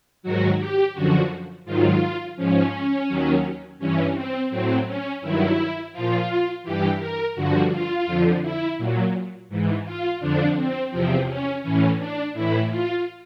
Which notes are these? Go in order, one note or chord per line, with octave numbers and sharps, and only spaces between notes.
G#2 D#3 F#3 F#4
G4
F#2 D3 F3 F#4
G#2 D#3 F#3 F4
G#2 F3 C#4
D#2 D#3 F#3
G2 E3 C#4
C4
A2 F#3 C4
C#4
G2 D#3 F#3 E4
A#2 F3 F4
G2 E3 G4
A#4
G2 D3 F3 F#4
F4
F2 D3 F3
E4
A#2 F#3
G#2 E3
F4
F2 D3 F3 D4
C4
E2 C3 F3 C4
C#4
A2 E3 C#4
D4
A2 E3 E4
F4